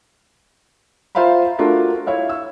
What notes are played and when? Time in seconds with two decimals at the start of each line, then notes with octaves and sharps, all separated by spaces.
1.15 F4 C5 E5 F5 A#5 B5
1.59 A3 D4 F4 F#4 A#4
2.07 E4 C#5 E5 F5
2.29 E6